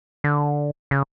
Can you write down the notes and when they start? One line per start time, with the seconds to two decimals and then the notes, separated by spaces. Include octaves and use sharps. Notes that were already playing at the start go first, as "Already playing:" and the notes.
0.24 D3
0.91 C#3